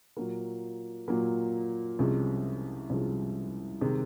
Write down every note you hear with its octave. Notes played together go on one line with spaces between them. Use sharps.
A#2 F#3 A#3
A#2 F#3 A#3
C2 C3 F3 G#3 C#4
C2 C3 F3 G#3 C#4
C3 D#3 G#3